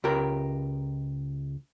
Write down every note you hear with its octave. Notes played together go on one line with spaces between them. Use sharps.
C#2 G4 A#4